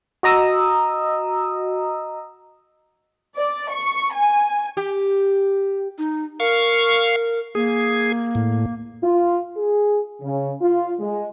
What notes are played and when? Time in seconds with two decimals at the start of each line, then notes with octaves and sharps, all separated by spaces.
0.23 F#4 D#5 A#5 D#6 E6
3.36 D5
3.71 C#6
4.13 G#5
4.77 G4
5.98 D#4
6.40 A#4 F5 C#6
7.55 A#3 G#4
8.35 A2
9.03 F4
9.56 G#4
10.22 C#3
10.62 F4
11.00 G#3